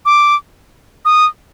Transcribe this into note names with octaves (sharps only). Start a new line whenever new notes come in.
D6
D#6